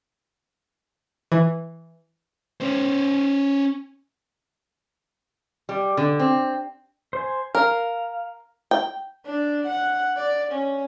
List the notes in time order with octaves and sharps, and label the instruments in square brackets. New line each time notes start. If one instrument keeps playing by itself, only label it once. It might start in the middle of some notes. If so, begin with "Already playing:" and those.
[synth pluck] E3
[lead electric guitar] C#4 C5
[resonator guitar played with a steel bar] G3
D3
C4
[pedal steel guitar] C5 G#5
[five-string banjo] A#4 [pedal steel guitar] F5
[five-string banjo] G5
[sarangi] D4
F#5
D5
C#4